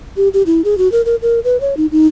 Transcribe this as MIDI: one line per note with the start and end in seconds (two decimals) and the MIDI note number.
0.17 0.28 67
0.34 0.42 67
0.46 0.62 64
0.65 0.77 68
0.78 0.90 66
0.92 1.04 70
1.05 1.16 70
1.22 1.40 70
1.44 1.60 71
1.61 1.74 73
1.77 1.86 63
1.92 2.07 63